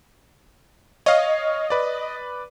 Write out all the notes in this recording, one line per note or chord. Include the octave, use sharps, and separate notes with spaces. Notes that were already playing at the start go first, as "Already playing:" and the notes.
C#5 D#5 F5
B4 D5